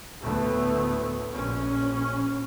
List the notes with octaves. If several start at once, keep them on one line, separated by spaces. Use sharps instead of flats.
D2 A2 A3 B3
A#1 C#4